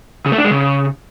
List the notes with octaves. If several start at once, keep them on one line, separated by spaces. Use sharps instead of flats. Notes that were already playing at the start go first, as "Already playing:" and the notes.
C#3
A3
D4
G#3
C#3